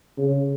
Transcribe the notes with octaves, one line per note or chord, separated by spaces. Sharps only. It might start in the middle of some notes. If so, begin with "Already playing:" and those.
C#3